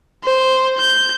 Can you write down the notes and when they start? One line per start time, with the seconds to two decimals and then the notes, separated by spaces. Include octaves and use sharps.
0.24 C5
0.78 G6